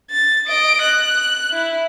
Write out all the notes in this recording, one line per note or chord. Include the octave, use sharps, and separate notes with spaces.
A6
D#5 D7
F#6
E4